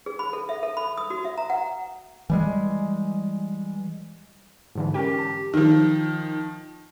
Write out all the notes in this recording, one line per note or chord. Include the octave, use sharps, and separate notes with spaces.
G#4
B5
A4
E5
A4
B5
D#6
F#4
E5
A#5
F#5
E3 G3 G#3
G#2 D3 E3
C#4 G4 A#4 G5
A5
D#3 F3